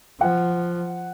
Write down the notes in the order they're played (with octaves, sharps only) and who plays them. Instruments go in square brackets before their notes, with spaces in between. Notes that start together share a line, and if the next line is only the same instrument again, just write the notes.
[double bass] F3 [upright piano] F#5